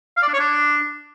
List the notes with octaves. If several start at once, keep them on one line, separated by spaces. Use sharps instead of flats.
F5
D5
D4
C#5
D4